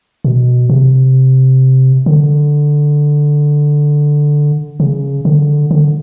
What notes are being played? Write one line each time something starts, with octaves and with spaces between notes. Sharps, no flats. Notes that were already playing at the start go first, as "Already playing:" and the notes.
B2
C3
D3
C#3
D3
D3